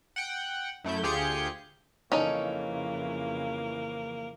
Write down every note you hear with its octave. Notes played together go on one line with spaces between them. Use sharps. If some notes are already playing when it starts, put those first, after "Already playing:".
F#5 G5
F#2 A3 E4 G6
D2 F4 G4 G#4 G6 C#7
F2 C#3 E3 A#3 C#4 D#4 A4